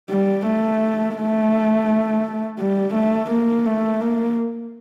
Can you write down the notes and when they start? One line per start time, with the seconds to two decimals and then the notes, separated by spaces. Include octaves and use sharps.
0.10 G3
0.46 A3
1.17 A3
2.59 G3
2.94 A3
3.31 A#3
3.66 A3
4.01 A#3